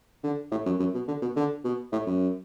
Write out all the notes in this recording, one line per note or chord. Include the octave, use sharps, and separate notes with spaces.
D3
A2
F#2
F#2
B2
D3
B2
D3
B2
A2
F#2